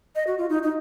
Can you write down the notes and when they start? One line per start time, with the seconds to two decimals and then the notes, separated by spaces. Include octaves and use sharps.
0.15 D#5
0.27 F#4
0.38 F4
0.49 D#4
0.63 D#4